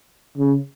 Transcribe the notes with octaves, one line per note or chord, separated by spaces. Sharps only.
C#3